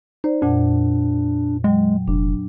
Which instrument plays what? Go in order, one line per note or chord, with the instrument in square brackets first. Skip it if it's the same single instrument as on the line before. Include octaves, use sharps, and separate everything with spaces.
[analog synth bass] D#4 [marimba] C5 D5
[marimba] F2 A#2 F#5 [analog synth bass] D4
[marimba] F#3 G5 [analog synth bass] G#3
[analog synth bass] F1 [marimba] D4